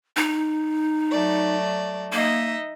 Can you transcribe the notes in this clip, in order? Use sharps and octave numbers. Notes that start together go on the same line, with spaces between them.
D#4
F#3 A3 D5
A#3 D#4 D#5 E5